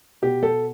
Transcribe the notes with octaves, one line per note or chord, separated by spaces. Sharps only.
B2 G4
A4